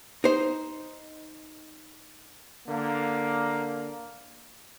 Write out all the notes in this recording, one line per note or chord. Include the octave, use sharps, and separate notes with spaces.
D#4 C5
D3 A#3